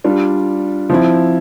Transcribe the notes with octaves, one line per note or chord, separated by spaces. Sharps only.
G3 D4 F4
F3 C4 E4